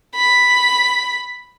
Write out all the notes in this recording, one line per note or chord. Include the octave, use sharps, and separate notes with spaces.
B5